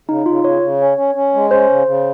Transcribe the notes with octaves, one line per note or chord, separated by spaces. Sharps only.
C#3 D#4
C#3 F4
C#3 C#5
C#3
C#4
C#4
C#4
G#3
C#4 C5
C#3
C#3